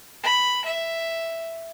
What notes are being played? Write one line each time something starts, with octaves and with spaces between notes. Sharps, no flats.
B5
E5